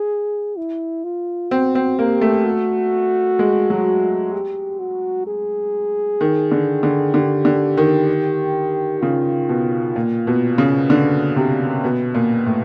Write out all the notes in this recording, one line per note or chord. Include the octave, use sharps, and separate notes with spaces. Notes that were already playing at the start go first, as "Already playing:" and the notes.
Already playing: G#4
E4
F4
C4 F#4
C4
A#3 G4
A3
F#4
G#3
F#3
G4
F#4
G#4
D#3
D3
D3
D3 G4
D3
D#3
C#3 F4
B2
A#2
B2
C#3
D3
C3
B2
A#2
A2